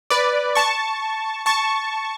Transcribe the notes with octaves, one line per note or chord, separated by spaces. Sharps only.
B4 D5
A5 C#6
A5 C#6